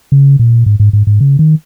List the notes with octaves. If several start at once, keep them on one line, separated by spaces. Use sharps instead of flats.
C#3
A#2
G#2
G#2
G#2
G#2
C#3
D#3